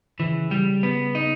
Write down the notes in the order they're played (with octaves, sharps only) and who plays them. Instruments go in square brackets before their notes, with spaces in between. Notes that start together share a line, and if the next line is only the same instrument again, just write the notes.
[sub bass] C#3 [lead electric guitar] E3
[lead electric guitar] G3
B3
D#4